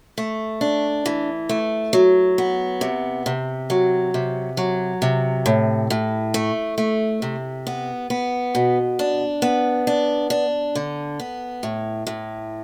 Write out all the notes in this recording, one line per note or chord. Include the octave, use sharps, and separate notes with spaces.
A3
D4
E3
A3
F#3
B3
C3
C3
F#3
C3
F#3
C3
A2
A2
A3
A3
C3
B3
B3
B2
D4
B3
D4
D4
D3
B3
A2
A2